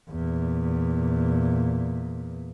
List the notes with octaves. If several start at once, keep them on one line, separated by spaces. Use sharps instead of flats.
E2 A#2